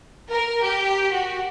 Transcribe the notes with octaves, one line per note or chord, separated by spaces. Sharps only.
A#4
G4
F#4